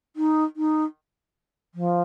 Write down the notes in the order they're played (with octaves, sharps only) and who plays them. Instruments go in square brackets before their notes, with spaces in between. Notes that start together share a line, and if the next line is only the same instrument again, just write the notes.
[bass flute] D#4
D#4
F3